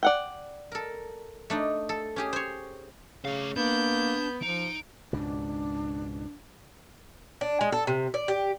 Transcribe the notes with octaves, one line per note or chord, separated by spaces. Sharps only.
D5 F#5 G5
A4 A#4
A3 D4 D#4
A4
C#4 G4 G#4
C5 C#5
C#3 A3 F5
A#3 B3 D4 G6
F3 D#4 D7
C#2 G#2 B2 D4
D4
G#3
A4
C3
D5
G4